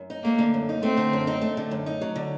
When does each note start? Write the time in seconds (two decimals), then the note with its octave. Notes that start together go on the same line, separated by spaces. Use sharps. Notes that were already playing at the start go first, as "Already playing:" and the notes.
Already playing: F#2
0.10 D#4
0.24 A3 A#3
0.39 D3
0.54 F#2
0.69 D#4
0.83 A3 C4
0.97 D3
1.13 F#2
1.27 D#4
1.42 A3
1.57 D3
1.71 F#2
1.86 D#4
2.01 F#3
2.16 D3